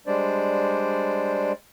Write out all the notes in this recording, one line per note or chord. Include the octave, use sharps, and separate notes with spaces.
G3 G#3 D4 C5 D5